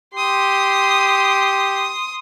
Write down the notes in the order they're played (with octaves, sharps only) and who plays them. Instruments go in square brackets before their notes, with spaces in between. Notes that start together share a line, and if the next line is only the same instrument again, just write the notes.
[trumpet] G4 [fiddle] C6 D#6